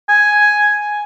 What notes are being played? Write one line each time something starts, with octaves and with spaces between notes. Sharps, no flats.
G#5